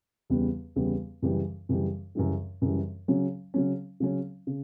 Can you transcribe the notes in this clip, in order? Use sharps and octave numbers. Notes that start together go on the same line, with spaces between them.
E2 C#3 G3 B3
E2 C#3 G3 B3
F#2 C#3 E3 G3
F#2 C#3 E3 G3
F#2 C#3 E3 G3
F#2 C#3 E3 G3
C#3 F#3 C#4
C#3 F#3 C#4
C#3 F#3 C#4
C#3